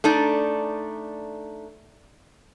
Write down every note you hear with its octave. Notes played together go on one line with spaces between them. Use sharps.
A3 D4 D#4 D5